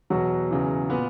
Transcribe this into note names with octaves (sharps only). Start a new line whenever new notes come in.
E2 B2 F#3 F#4
E2 C#3 E3
A#2 B3 B4